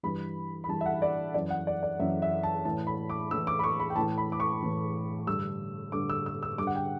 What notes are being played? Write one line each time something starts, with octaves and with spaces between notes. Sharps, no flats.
G2 E3 B5
B5
G2 E3 A5
E5
F#5
D5
F#2 E3 D5
F#5
D5
D5
F#2 E3 E5
E5
A5
A2 E3 A5
B5
D6
A2 E3 E6
D6
B5
C#6
B5
G5
A2 E3 A5
B5
D6
C#6
A2 E3
G2 D3 E6
G2 D3 D6
E6
E6
E6
G2 D3 D6
F#5
G5